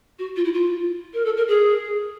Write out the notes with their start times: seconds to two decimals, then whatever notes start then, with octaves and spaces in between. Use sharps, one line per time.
0.19 F#4
0.36 F4
0.45 E4
0.54 F4
1.14 A#4
1.25 A4
1.37 A#4
1.48 G#4